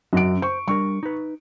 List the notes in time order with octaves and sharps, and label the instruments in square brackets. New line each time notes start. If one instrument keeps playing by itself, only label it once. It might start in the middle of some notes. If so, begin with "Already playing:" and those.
[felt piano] F#2 D7 [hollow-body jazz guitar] F#4 D#5 F#5
[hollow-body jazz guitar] C5 [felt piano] C#6
[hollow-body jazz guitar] G3 D4 A#4 [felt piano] C#6
[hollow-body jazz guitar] D#4 B4